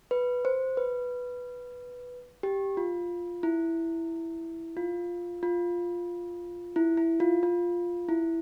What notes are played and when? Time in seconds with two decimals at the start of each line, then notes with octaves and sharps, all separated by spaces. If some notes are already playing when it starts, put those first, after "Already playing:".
0.11 B4
0.45 C5
0.77 B4
2.43 G4
2.77 F4
3.43 E4
4.77 F4
5.43 F4
6.76 E4
6.97 E4
7.20 F4
7.43 F4
8.09 E4